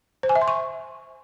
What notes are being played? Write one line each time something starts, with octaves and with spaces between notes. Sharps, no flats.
C5
G#5
E5
C6
C#6